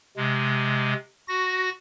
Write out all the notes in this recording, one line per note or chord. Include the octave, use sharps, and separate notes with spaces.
C3 G#3
F#4 A#6